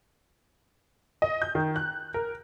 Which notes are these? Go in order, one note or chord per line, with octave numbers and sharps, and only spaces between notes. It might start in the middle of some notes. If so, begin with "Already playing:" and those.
D#5
G6
D#3
F#6
A#4